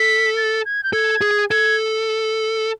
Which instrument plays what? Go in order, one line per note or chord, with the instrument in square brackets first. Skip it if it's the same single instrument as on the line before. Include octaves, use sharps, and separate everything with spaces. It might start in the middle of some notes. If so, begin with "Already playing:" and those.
Already playing: [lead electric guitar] A4 [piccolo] B6
[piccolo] A6
G#6
G6
[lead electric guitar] A4 [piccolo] G#6
[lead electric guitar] G#4
[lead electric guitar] A4 [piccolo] G#6